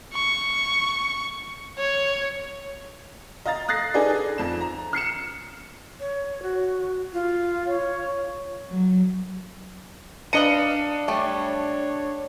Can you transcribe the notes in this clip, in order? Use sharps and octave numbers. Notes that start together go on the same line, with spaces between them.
C#6
C#5
D#5 F5 A#5 A6
D#6 F#6 A6 A#6 C7
D#4 G#4 A4 B4 D5 D#5
F2 E7
A#5
F6 C7 C#7 E7
C#5
F#4
F4
C#5
F#3
D4 B4 D#5 F5 A#5 C#7 D#7
G3 A3 C#5